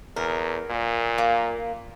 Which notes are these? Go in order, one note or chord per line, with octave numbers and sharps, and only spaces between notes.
E2 A#4
A#2
A#3